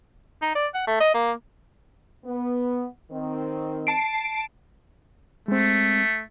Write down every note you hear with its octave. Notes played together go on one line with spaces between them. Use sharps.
D#4
D5
F#5
A3
D#5
A#3
B3
D#3 C4
A5 C7 D7
G#3 A3 C4